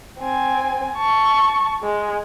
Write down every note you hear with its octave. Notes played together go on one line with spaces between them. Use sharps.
C4 G#5
A5 C#6
G#3